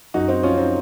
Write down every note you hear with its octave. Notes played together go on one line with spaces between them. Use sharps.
F#2 D#4 F#4
C4 D#4
F3 C#4 F4
C4 D#4